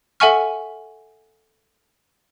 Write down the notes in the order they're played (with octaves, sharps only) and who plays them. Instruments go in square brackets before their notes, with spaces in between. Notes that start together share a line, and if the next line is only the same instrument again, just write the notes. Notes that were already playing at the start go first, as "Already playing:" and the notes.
[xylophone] A4 E5 F#5 G#5 C#6 F6